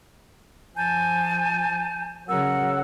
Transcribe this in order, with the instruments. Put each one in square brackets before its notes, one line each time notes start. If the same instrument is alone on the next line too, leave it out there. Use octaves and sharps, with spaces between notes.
[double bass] F3 [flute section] G#5 A5 G6
[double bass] C#3 F#3 [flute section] A#4 F#5 E6